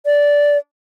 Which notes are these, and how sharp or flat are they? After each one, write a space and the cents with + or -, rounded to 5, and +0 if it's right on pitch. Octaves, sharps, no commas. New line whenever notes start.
D5 -10